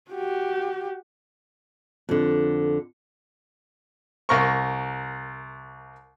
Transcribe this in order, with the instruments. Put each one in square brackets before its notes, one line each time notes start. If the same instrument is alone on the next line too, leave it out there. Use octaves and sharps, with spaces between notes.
[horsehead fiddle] F#4 G4
[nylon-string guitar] F2 D3
[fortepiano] C2 A#4 C#6